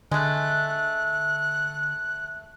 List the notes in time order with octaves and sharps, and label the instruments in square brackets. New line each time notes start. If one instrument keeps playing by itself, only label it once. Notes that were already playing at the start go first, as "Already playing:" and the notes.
[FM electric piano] D3 [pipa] G#3 A3 [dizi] F#6